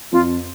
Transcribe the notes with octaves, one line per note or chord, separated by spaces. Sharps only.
F2 F4